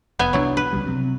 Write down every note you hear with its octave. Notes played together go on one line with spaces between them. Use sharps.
F1 B3 E5 G#5
C2 F3 F#3 D4 E4
B4
C#2 C#3 G3
C3 F#3 C4